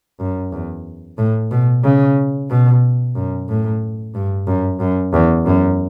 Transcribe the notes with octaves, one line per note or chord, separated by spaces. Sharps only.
F#2
E2
A2
B2
C#3
B2
F#2
A2
G2
F#2
F#2
E2
F#2